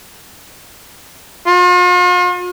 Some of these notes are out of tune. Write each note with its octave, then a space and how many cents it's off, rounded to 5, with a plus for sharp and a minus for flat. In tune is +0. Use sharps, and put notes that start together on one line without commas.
F4 +45